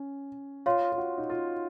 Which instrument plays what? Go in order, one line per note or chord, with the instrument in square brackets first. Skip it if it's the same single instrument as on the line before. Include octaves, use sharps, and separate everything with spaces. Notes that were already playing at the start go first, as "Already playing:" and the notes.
Already playing: [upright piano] C#4
[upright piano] F4 [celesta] C#5 F5 C6
[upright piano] F4
F#4
D#4
F4